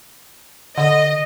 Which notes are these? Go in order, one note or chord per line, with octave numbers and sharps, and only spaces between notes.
D3 D#5